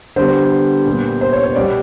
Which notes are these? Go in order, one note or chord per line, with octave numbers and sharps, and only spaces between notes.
D3 G3 B3 C5
A#2 G3 B3
C5
C#5
C#5
B2 G3 B3 D5